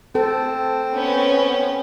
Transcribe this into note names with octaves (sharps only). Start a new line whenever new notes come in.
C4 A4
B3 C#4